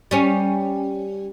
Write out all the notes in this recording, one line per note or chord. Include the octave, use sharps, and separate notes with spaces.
G3 C#4